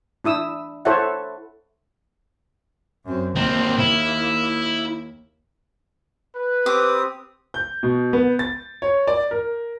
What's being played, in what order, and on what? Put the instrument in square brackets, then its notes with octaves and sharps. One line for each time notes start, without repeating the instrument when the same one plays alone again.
[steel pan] D4 E4 D#6 E6
E4 A4 C5 C#5 E5 F#5
[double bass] F#2 C4
[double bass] D#2 A#3 [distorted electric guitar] C4 D#4
[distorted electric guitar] E4
[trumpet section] B4
[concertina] C4 G4 D#6 [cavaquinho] D6
[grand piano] G6
B2
B3
A6
C#5
D5
A#4